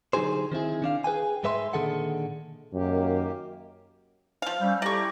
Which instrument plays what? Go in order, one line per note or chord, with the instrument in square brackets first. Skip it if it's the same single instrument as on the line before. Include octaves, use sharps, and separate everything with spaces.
[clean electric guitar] D3 F#3 D#4 G4 G#4 C5
D#3 C4 E4 G#4
D#3 D4 F5
G#4 B4 G5 G#5
G#2 G#3 B4 E5 B5 C6
A#2 D3 D#3 G#4 A4 F#5
[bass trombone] F#2 [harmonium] D#3 A#3 G4
[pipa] F3 F5
[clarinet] G3 [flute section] C#4 E6 G6
[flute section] E4 G4 A4 [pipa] D5 C#6 [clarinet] A#5